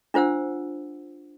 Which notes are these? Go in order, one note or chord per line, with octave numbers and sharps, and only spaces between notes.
D4 F4 C5 F#5 E6